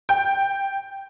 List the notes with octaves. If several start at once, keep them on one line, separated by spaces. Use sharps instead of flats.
G5